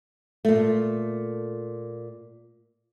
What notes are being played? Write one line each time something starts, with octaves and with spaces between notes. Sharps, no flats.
A#2 A3